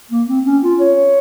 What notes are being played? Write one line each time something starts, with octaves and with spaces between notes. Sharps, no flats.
A#3
C4
C#4
F4
C#5